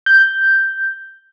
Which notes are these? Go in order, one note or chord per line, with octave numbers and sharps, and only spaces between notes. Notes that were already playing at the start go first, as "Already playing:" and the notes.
G6